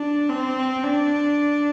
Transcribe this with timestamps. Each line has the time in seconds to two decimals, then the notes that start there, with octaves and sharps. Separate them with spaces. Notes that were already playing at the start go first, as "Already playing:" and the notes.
Already playing: D4
0.29 C4
0.84 D4